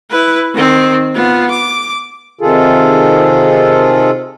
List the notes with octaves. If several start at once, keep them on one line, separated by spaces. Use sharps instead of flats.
E4 B4
D#3 C4
B3 F4
D6
C3 D#3 F4 G#4 A4